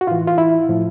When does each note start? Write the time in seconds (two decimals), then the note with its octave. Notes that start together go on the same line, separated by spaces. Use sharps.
0.01 F#4
0.07 A2 E3 F4
0.27 F4
0.38 E4
0.69 A2 F3